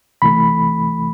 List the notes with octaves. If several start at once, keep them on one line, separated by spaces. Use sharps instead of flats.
C2 C3 E3 A3 B5